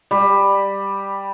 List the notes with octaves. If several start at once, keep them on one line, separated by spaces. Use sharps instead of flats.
G3